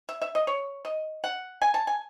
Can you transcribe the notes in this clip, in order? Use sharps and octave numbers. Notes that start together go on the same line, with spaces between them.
E5
E5
D#5
C#5
D#5
F#5
G#5
A5
G#5